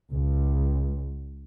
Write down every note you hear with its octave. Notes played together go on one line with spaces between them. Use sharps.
C#2